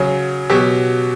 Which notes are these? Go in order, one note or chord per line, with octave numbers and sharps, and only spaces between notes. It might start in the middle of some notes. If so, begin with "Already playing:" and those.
Already playing: C#3 F#3
B2 F#3 G4